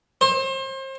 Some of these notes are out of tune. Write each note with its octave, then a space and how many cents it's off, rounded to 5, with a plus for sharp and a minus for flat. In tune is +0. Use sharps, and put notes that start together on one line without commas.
C5 +35